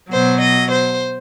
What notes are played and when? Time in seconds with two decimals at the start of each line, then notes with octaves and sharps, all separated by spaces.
0.10 B2 F#3 C5
0.40 D#5
0.71 C5